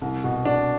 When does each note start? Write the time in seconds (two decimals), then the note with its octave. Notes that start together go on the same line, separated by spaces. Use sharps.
0.02 C2
0.24 B2
0.45 B2 D4